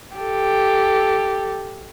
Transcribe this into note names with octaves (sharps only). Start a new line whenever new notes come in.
G4 A4